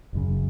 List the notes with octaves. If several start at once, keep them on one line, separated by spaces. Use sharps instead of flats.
F#1 F#2 C#3